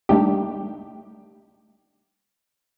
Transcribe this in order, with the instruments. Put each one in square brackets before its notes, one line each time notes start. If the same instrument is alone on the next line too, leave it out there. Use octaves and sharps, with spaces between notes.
[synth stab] G3 A3 A#3 D4 D#4 G4